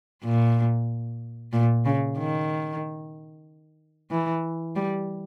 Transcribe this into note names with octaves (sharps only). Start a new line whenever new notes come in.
A#2
A#2
C#3
D#3
E3
G3